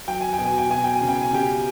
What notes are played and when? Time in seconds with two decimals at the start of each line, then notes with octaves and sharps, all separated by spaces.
0.07 F#3 G5
0.21 G#5
0.33 G5
0.38 B2
0.45 G#5
0.58 G5
0.70 B2 G#5
0.84 G5
0.95 G#5
1.01 C#3
1.08 G5
1.21 G#5
1.31 C#3 G4 G5